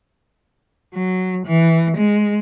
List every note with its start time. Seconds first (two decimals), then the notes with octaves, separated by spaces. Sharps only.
0.94 F#3
1.46 E3
1.97 G#3